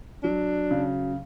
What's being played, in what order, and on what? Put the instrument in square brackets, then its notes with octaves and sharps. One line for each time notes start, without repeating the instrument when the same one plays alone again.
[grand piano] F#3 [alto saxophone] D4
[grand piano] C#3